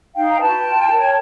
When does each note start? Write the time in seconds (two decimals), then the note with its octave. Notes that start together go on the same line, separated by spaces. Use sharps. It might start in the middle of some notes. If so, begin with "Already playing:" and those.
0.15 D#4 F5 G5
0.29 A#5
0.40 F#4 B4 G5 A5
0.65 F4
0.90 A#4 C#5